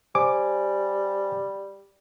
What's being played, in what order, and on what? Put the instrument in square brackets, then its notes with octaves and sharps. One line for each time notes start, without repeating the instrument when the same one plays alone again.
[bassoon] G3 [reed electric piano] C5 G#5 D6